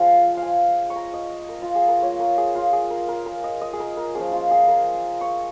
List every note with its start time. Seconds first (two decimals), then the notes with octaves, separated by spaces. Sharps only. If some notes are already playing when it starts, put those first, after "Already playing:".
Already playing: F3 G#3 F4 F5
0.37 F5
0.43 G#5
0.90 C#6
0.96 A#5
1.14 D#5
1.49 A#4
1.62 F4
1.75 G#4
1.88 A#4
2.02 A#3 F4 C#5
2.20 A#4
2.38 G#4
2.55 F4
2.73 G#4
2.90 A#4
3.08 A#4
3.26 A#4
3.44 D#5
3.61 D#5
3.73 G#4
3.80 A#4
3.97 A#4
4.15 F3 A#3 C#4 G#4
4.32 F4
4.51 G#4
4.68 A#4
5.21 C#6